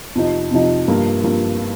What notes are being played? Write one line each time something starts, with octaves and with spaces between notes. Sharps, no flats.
F2 C3 F3 D#4
F2 C3 F3 D#4
G2 F3 A#3
G2 F3 A#3